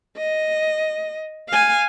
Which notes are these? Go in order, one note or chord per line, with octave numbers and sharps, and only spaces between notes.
D#5
F5 G#5